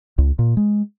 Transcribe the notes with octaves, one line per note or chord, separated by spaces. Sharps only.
C#2
A#2
G#3